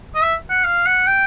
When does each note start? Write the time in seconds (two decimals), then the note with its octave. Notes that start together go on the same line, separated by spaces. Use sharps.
0.15 D#5
0.22 E5
0.50 F#5
0.64 F5
0.87 F#5
1.07 G5